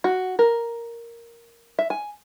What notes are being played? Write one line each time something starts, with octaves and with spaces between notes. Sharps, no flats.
F#4
A#4
E5
G#5